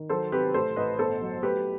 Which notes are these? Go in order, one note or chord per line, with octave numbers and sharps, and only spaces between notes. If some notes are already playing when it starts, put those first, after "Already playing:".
Already playing: D#3
F#3 A4 C5
C3 G4 B4
A1 A4 C5
A1 B4 D#5
G1 A4 C5
F#3
A3 G4 B4